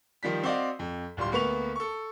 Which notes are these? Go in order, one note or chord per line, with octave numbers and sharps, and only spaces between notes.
D#3 F3 G3 B6
C4 F#4 D5 D#5 F5
F2
D1 G3 F4 C6
D2 A#3 B3 B4 C#6 F7
A4 C#6